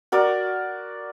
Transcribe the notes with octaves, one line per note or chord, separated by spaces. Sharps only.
F#4 A#4 D5